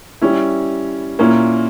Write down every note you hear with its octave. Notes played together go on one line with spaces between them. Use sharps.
G3 C#4 E4
A#2 A#3 C#4 E4